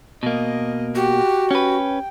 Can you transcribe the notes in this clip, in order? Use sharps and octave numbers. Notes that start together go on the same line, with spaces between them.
B2 A#3 D#5
F#4 G4
C#4 B4 G5